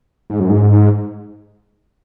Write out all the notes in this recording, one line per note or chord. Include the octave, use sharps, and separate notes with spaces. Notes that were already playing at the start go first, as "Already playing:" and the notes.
G#2
F#2
G#2